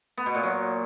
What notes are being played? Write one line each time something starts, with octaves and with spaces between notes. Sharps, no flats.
B3
B2
A#2
F#3